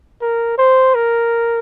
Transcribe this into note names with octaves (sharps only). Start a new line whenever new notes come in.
A#4
C5
A#4